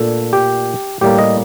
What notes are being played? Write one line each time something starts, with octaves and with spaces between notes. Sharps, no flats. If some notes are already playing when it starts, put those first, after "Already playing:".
Already playing: A#2 A3 D4 A4
G4
A2 G3 A#3 G4
D#5